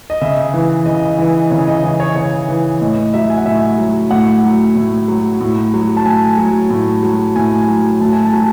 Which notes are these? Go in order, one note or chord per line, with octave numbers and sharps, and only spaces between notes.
D#5
C#3 E5
E3
C#3 D#5
E3 D#5
C#3 C#5
D#5
E3 D#5
C#5
C#3 C#5
E3
A2 D#5
F#3 E5
G#5
F#5
A2 E5
F#3
A2 F#5
F#3
A2
F#3
A2
F#3
A5
A2 G#5
F#3
A2
F#3
A2 G#5
F#3
A2 A5
G#5
A5
F#3